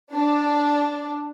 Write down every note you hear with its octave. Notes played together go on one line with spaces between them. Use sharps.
D4